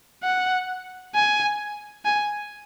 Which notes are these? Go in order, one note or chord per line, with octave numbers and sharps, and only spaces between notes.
F#5
G#5
G#5